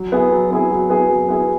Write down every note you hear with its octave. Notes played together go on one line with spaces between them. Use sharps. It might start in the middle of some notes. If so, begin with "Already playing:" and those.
Already playing: F#3
B3 E4 G#4
F#3
B3 E4 G#4
F#3
B3 E4 G#4
F#3
B3 E4 G#4